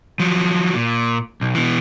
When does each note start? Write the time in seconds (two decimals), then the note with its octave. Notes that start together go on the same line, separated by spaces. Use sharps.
0.20 F3 F#3
0.75 A#2
1.41 B1
1.55 B2 E3